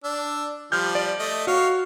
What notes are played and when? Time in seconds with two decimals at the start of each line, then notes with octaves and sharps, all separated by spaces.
0.04 D4 E6
0.72 F3 G3 F6 G6
0.95 D5
1.19 A3 D#5
1.47 F#4 C#5 F5